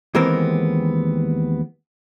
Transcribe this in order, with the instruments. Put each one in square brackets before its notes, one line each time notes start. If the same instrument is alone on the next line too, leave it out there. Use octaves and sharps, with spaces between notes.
[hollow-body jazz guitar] D#2 E3 G#3 B3 C4 A#4